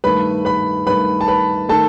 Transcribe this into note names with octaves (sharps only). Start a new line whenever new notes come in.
G2 D#3 A3 B4 B5
B4 B5
G2 D#3 A3 B4 B5
A5
B4 B5
D#3 A3 A4 A5